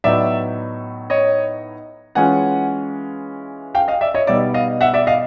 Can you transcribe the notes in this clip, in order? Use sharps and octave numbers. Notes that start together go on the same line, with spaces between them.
A2 F#3 B3 D#4 D5 E5
C#5 D#5
E3 G#3 C#4 F4 F#5 G#5
F5 G5
D#5 F5
D5 E5
C#5 D#5
B2 G3 B3 D#4 D5 E5
D#5 F5
E5 F#5
D5 E5
D#5 F5